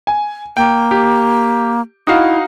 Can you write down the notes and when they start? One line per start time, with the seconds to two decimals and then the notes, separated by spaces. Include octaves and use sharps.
0.07 G#5
0.57 A#3 G5
0.91 G4
2.07 D#4 E4 F#4 F5